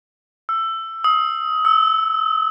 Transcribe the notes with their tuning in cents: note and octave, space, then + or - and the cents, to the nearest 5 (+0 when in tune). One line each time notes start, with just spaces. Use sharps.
E6 +15
D#6 +25
E6 -15